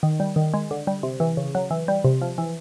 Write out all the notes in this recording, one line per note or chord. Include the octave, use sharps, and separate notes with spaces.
D#3
G3
D#3
G#3
D3
G3
C3
E3
C#3
F#3
E3
G3
C3
F3
E3